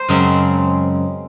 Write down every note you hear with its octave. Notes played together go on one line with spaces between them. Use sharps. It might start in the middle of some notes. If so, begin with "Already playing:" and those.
Already playing: C5
F#2 C#3 G#3 C4